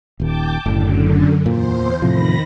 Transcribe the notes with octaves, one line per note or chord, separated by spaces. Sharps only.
D#1 D#2 G5 A5 D6
F#1 F#2 A2 D3
E2 A#2 C5
A2 C3 D#3 F3 B5 A#6